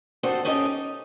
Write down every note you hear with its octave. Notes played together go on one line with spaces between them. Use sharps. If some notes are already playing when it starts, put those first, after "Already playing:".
D4 D#4 F#4 G4 A4 C5
C#4 D#4 G4 A4 D#5
D#4